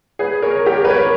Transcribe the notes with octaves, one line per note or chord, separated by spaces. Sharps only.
G#4 B4
A#4 C#5
G4 A#4
B4
A#4 C#5